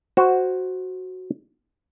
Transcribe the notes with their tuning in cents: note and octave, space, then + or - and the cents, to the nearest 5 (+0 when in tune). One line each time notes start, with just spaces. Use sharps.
F#4 +0 C5 +0